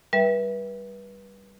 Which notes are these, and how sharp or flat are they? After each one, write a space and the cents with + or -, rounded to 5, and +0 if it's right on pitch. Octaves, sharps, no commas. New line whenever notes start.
G3 +0 B4 -30 E5 +0